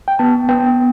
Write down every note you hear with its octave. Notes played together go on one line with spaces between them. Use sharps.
G5
B3 A5
B3 G5